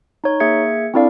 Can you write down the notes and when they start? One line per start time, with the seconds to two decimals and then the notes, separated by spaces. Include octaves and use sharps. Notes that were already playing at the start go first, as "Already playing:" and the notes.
0.24 D#4 C#5
0.40 A#3 G#4 E5 G#6 C#7
0.94 C4 D4 E4 A4 D5 F5